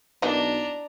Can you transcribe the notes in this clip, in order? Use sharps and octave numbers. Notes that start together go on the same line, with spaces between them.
B1 E3 A#3 D4 D#4 A#5